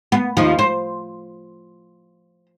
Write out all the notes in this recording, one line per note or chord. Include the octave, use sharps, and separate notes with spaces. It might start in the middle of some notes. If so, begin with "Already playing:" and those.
B3
D#2 F3
C5